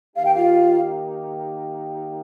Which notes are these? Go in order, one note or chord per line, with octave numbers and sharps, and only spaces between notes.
D#3 A#3 D#4 G4 F5
G5
F4 F5